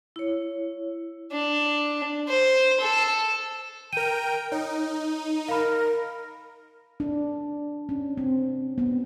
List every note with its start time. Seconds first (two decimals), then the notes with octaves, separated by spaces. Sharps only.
0.16 E4 C#5
1.32 D4
2.28 C5
2.80 A4
3.93 A#4 G5 D#7
4.52 D#4 C#5
5.48 A#4 F5 B5
7.00 D4
7.89 C#4
8.18 C4
8.78 B3